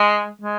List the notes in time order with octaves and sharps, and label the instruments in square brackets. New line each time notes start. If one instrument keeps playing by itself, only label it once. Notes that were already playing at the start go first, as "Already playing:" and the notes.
Already playing: [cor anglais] G#3
G#3